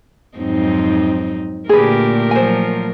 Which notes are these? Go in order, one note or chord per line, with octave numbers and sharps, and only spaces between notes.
F2 G#2 F#3 C4 D#4
A#2 D3 A3 G4 G#4 A#4 B4
F3 F#3 C5 G#5